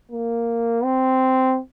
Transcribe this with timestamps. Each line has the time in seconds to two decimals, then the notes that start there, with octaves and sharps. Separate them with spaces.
0.11 A#3
0.84 C4